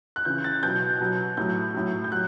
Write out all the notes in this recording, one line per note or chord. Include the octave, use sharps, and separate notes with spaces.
F#6
C#3 E3 G6
A6
B2 F#3 G6
B2 F#3
A2 F#3 G6
A2 F#3
G6
F#3 F#6